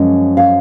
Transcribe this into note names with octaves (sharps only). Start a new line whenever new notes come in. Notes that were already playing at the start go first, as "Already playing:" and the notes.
Already playing: F#2 F3 G#3 C#4
F5